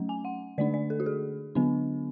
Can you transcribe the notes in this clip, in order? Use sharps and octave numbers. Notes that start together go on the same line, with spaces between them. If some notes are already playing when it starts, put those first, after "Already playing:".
Already playing: F#3 A3 C#4
G#5
F#5
D3 A3 D4 D5
D5
A4
F#4
G#4
D3 F#3 B3 D4